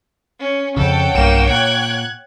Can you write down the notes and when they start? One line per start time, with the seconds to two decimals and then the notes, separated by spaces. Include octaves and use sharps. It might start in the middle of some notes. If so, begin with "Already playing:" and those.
0.40 C#4
0.77 F2 C#3 A4 C#5 F#5 G5
1.14 B1 G2 A#3 E7
1.50 A#2 F#6 G#6